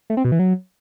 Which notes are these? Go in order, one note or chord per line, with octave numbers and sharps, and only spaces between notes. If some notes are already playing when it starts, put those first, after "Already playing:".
A3
C4
B2
E3
F#3